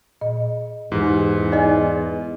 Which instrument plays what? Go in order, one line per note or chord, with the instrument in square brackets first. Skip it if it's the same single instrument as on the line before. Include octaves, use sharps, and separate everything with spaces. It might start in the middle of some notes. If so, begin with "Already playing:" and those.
[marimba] A#2 D#5
[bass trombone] E2 [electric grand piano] G#2 E3 [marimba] D#4 E4 G4
[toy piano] D#4 D#5 [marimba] D5 G#5